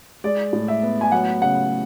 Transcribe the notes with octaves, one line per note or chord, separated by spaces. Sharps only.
G#3 D5
A2
E5
B3
G#5
F#3 F#5
C#3 F#5